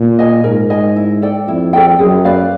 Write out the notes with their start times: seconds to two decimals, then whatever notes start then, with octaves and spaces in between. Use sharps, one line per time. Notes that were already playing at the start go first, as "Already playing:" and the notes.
Already playing: A#2
0.19 D#5 G#5
0.44 G#2 A#4
0.70 D#5 G#5
0.96 E4
1.22 A4 D5 G5
1.48 F2 E4
1.73 A4 D5 G5
1.99 F#2 G#4
2.25 B4 D5 F5